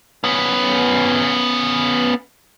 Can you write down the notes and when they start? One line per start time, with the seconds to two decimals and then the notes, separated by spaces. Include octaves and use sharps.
0.24 B3 C#4